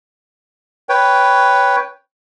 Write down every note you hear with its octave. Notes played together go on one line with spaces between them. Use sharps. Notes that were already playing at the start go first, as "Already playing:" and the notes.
B4 C#5 G5